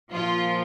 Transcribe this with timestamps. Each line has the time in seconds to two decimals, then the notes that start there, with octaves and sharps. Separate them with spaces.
0.11 A#2 F3 F4